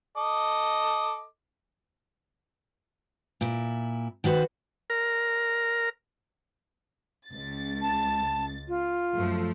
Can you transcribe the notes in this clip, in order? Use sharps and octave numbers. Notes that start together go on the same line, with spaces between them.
A4 D#5 D6
A#2 E4
D#3 F#4 B4 C5
A#4
C#2 A6
A5
F4
F#2 F3 A3